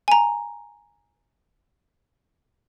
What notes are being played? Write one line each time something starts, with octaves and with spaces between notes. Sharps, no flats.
G#5 A#5